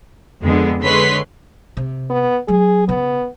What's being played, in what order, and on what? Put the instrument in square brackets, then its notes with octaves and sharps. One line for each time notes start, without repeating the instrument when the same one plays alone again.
[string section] F2 D3 G#3 B3
D3 G#3 B4 C#5 C6 B6
[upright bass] C3
[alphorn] B3
[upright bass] F#3 [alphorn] G#4
[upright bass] C#3 [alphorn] B3